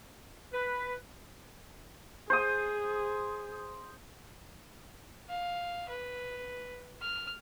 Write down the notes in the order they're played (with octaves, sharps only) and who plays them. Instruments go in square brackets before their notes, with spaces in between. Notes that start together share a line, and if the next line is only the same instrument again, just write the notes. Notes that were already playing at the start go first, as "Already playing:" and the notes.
[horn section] B4
[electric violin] G#4 [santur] C5 D#6
[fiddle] F5
B4
F6